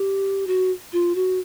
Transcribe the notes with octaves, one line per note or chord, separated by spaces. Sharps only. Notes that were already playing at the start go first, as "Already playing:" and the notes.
Already playing: G4
F#4
F4
F#4